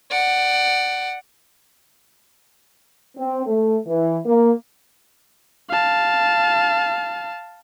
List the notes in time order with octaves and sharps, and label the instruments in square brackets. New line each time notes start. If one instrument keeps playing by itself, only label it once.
[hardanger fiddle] D5 F#5
[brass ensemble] C4
A3
E3
A#3
[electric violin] F5 A5